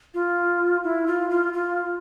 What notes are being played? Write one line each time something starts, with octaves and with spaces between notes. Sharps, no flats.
F4
E4
F4
F4
F4